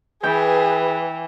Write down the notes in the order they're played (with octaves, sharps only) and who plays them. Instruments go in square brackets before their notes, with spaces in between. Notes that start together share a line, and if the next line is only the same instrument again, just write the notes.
[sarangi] E3 [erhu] G#4 [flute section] B4 [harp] G5